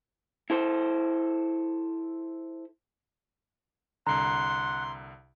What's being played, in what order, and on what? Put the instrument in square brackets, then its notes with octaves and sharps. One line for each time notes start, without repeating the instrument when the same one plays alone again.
[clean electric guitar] E4 A4 C5
[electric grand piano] C2 D3 [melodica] F#5 [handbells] A#5 [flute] C6